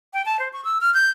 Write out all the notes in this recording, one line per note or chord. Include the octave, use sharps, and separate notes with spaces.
G5
A5
C5
C#6
E6
F6
G6